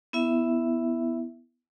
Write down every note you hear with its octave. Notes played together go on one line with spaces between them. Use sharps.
B3 E4 E5